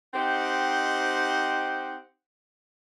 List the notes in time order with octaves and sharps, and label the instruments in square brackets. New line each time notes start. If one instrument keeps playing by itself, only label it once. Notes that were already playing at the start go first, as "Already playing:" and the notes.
[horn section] C4 D#4 G4 C5 D#5 F#5